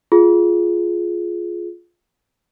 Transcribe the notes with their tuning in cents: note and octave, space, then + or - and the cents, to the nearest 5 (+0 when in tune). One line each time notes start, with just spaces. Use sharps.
F4 +0 G#4 +20